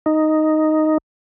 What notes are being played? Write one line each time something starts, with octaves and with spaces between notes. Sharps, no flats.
D#4